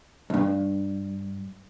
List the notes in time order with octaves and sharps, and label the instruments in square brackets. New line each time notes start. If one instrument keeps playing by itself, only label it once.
[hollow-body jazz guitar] B1 G2